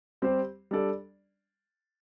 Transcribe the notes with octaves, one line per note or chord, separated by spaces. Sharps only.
G3 C4 G4 C5
G3 D4 A4 D5